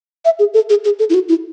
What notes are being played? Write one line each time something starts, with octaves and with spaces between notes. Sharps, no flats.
E5
G#4
A4
G#4
G#4
A4
E4
F#4
E4